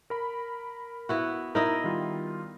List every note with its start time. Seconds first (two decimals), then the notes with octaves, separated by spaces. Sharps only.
0.10 A#4 B5
1.09 B3 E4 F#4
1.55 D#4 E4 A#4 D#5
1.84 D#3 G3 F4